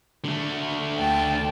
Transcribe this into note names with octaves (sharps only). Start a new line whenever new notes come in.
D3 A3
D2 G5 A5